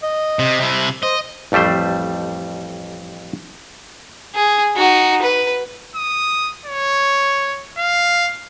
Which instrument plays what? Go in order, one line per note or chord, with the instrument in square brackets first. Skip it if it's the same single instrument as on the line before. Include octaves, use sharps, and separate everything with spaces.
[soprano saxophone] D#5
[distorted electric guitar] C3
C3 E4
[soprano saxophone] C5 [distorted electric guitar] D#5
[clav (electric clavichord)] A1 F2 G3 A3 C5
[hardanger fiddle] G#4
D#4 F#4
B4
[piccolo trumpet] D#6
C#5
F5